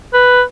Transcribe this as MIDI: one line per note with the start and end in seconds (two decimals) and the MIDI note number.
0.14 0.42 71